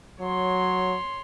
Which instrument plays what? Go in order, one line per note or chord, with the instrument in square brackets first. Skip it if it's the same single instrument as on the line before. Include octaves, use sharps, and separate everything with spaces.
[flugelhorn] F#3 [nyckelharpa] C#5 C6